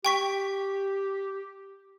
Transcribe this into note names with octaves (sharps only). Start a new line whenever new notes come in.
G4 G5 C#6 B6